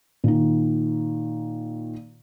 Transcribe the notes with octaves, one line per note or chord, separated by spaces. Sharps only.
A#2 D#3